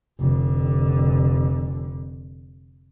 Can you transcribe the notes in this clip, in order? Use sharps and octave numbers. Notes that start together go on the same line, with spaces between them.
F1 D3